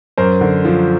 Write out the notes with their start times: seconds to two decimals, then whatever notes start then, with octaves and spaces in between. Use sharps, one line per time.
0.18 F#2 A#4 C5
0.41 D3
0.65 F3